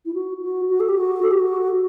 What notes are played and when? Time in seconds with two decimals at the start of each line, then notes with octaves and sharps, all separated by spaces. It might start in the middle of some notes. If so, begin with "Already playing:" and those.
0.06 E4
0.14 F#4
0.42 F#4
0.69 F#4
0.80 A4
0.89 G4
0.97 F#4
1.22 A4
1.31 G4
1.39 F#4